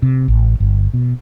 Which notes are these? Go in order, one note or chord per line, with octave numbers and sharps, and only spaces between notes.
C3
A1
G1
B2